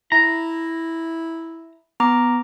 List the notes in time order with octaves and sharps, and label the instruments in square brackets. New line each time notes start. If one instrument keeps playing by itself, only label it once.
[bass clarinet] E4 [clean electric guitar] A#5
[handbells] B3 A#5 D6